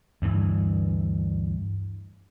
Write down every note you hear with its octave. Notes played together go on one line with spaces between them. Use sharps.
D2 G2 E3